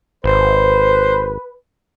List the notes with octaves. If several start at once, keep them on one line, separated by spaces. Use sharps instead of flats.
G#1 B4 C5